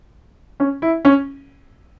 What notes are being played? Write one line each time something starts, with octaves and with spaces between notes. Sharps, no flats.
C#4
E4
C#4